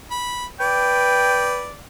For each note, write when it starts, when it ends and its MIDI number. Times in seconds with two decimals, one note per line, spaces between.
0.11 0.45 83
0.60 1.68 71
0.60 1.82 74
0.60 1.63 79